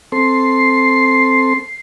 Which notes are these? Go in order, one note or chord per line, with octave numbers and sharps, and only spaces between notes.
C4 A4 C6 C7